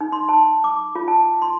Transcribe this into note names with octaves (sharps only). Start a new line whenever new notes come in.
D#4
C6
A5
D6
F4
A5
C6